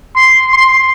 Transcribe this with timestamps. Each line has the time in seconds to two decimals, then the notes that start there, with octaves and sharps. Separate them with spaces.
0.15 C6
0.53 C6